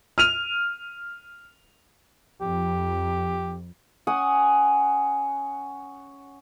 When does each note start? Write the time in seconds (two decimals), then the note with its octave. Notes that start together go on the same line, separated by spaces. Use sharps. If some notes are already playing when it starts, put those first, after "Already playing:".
0.18 F6 D#7 F7
2.41 F2 G4
4.07 C#4 F#5 G#5 D#6